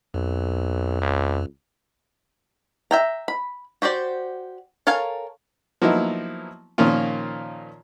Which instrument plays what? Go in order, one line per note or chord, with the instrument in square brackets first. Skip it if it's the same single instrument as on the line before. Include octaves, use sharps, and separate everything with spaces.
[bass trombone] B1 [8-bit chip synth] F2
[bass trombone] C#2
[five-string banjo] E5 G5 A#5
B5
F#4 G4 C5 D5
A4 A#4 C#5 F5 G#5
[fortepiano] F3 F#3 A#3 B3 D#4 E4
A#2 D#3 F3 A#3 C#4 F4